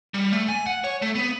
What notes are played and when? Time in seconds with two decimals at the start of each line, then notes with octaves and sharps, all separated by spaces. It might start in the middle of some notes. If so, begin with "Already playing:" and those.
0.14 G3
0.33 A3
0.49 G#5
0.67 F#5
0.84 C#5
1.02 A3
1.16 B3